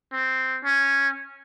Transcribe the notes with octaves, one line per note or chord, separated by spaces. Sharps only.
C4
C#4